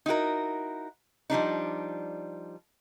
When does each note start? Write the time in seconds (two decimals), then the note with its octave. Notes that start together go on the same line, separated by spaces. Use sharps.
0.06 D#4 E4 F#4 A#4
1.30 F3 G3 D4 D#4